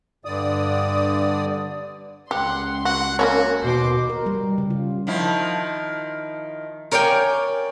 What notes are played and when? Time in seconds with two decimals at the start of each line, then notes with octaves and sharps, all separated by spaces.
0.25 G2 D3 D5 D#6
2.31 C#2 G4 F#5 C6
2.85 F#4 F#5
3.19 A#3 C#4 F#4 C#5
3.63 D#2 B2 C5 C6 D6
4.09 A#4
4.26 G3
4.58 C#3
4.70 F4
5.07 D#3 F3 E4
6.91 A#4 C#5 D5 F5 G5 G#5